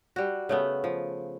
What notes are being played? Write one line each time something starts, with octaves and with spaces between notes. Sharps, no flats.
G3 F#4
C#3 A3 B3
F3